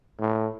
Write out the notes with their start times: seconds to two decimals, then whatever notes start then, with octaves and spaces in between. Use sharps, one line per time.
0.20 A2